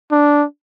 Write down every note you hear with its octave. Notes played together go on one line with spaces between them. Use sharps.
D4